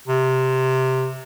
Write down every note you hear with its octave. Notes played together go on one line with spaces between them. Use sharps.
C3